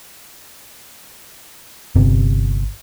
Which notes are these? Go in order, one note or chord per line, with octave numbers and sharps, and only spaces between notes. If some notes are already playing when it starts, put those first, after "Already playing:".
G1 C3